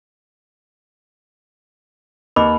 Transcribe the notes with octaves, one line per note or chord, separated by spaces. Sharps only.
D#2 B4 D#5 B5 D6